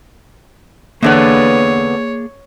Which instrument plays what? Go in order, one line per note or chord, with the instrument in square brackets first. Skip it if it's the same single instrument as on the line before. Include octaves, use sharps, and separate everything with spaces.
[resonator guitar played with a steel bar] E2 D3 B3 [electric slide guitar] A#3 G#4 D5 [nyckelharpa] C#5